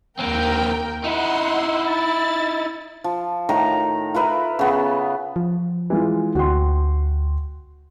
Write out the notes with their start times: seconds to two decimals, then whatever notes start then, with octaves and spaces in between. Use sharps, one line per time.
0.19 D#2 A#3 C4 A#4 G5
1.04 D#4 E4 F#5 C6
1.89 A6
3.04 F3
3.49 A2 D#3 A#5
4.14 F4 A#4 B4 E5
4.59 C#3 B3
5.36 F3
5.90 E3 G#3 F4
6.35 D2 F#4 G5 C6